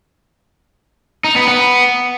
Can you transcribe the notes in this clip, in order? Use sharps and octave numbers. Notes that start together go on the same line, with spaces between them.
D#4
B3
B3